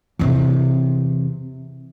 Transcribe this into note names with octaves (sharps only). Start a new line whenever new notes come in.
E2 C3